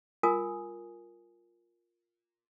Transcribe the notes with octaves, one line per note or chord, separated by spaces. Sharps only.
F4 A#4 G#5 D#6